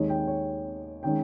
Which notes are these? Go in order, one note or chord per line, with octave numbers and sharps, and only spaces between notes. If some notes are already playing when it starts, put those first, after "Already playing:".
Already playing: D#2 D#3 G#3 C#5
G5
C#5
D#3 G#3 C#4 G5